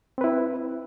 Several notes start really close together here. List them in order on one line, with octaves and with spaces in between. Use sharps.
C4 B4 E4